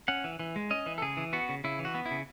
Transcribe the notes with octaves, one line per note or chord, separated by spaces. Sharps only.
C#4 F#5
E3
E3
G#3
C#4 D#5
E3
A4
C#3 G#4
E3
B3 F#4
C#3
C#3 E4
E3
F#4
B3
E4
C#3